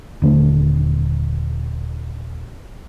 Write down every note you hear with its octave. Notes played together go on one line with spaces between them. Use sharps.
D#1 D3 A3